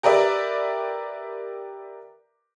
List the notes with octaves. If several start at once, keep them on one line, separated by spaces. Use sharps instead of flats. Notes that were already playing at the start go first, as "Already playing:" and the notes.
G4 A#4 B4 D5 E5